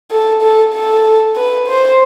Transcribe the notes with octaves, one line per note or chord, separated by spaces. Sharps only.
A4
A4
A4
B4
C5